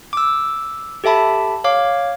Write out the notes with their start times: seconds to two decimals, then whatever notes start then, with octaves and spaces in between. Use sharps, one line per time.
0.13 D6 E6
1.04 G4 A4 E5 A5 B5
1.64 C#5 F5 D6